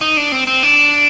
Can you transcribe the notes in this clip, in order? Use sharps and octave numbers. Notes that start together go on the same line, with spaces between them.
D#4
D4
C4
C4
D4